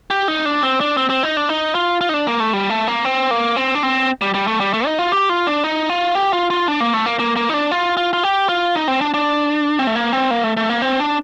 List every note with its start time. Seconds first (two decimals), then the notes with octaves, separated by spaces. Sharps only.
0.10 G4
0.28 D#4
0.45 D4
0.63 C4
0.81 D4
0.97 C4
1.10 C4
1.23 D#4
1.37 D4
1.49 D#4
1.75 F4
2.01 F4
2.09 D#4
2.14 D4
2.27 A#3
2.40 A3
2.53 G3
2.70 A3
2.88 A#3
3.05 C4
3.31 A#3
3.56 C4
3.75 D4
3.83 C4
4.22 G3
4.34 G3
4.47 A3
4.60 G3
4.74 A3
4.86 D#4
4.99 F4
5.12 G4
5.29 F4
5.47 D4
5.64 D#4
5.90 F4
6.15 G4
6.33 F4
6.50 F4
6.68 D4
6.80 A#3
6.94 A3
7.06 A#3
7.19 A#3
7.36 A#3
7.49 D#4
7.54 D4
7.71 F4
7.97 F4
8.13 F4
8.23 G4
8.49 F4
8.75 D#4
8.88 C4
9.01 D4
9.14 D4
9.79 C4
9.87 A3
9.96 A#3
10.13 C4
10.31 A#3
10.44 A3
10.57 A3
10.70 A#3
10.82 C4
11.00 D4